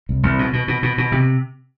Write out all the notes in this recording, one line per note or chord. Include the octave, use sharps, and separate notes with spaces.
C2
C2
B2
B2
B2
B2
B2
C3